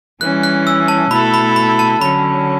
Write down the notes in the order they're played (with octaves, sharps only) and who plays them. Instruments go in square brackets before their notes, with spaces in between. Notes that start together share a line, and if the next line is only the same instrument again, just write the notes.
[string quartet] E3 G3 C#4 [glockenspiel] F#6
[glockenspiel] F#6
E6
A5
[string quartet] B2 A3 E4 A4 [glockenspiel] B5
[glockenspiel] B5
B5
A5
[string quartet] D3 F#3 C#4 [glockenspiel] B5